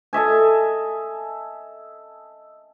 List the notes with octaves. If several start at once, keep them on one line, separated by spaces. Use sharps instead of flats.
A4 D#5 E5 G#5